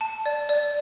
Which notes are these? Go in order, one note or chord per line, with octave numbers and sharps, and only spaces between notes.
A5
D5
D5